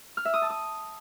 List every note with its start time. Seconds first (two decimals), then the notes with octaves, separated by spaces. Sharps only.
0.17 F6
0.25 E5
0.34 D#6
0.42 A5
0.50 D#6